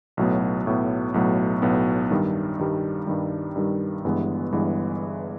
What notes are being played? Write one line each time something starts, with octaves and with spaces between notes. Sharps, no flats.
B1 A2 F#3 B3
B1 A2 F#3 B3
B1 A2 F#3 B3
B1 A2 F#3 B3
G2 D#3 G3
G2 D#3 G3
G2 D#3 G3
G2 D#3 G3
G1 G2 E3 G#3 B3
G1 G2 E3 G#3 B3